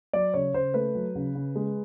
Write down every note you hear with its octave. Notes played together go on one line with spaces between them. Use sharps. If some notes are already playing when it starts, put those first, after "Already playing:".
F#3 D5
C#3 C#5
C#3 C5
A3 B4
F#3
C#3
C#3
G#3